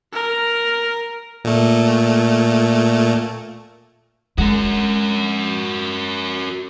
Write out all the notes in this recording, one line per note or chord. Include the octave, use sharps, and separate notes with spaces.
A#4
A#2 A3
G#3 F#4 A#4